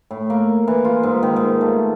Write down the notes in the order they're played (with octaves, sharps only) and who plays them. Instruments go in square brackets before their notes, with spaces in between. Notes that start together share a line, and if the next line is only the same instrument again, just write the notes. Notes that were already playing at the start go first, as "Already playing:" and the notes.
[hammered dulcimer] A2
A#3
E3
F4
G#2
D#3
G#2
A3